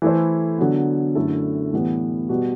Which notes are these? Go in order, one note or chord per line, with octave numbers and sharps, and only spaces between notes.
E3 A3 E4 A4 C5
D3 F#3 B3
F#2 D3 A3 E4 A4
A2 E3 G3 B3
B2 G3 B3 F#4